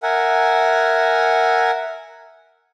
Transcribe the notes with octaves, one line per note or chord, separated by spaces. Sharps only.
A#4 E5 F#5 G#5